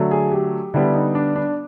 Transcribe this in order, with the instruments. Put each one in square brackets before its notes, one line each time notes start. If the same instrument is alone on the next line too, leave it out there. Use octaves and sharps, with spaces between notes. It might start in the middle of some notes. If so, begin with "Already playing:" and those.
Already playing: [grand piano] D3 F#3 A3
G#4
G4
D3 G3 B3 E4
D#4
D4
D4